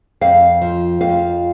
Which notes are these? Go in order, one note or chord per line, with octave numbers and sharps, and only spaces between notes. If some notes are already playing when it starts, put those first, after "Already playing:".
F2 F5
F3
F2 F5